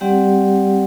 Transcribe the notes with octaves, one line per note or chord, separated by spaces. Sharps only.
G3 C4 G4 D5 F#5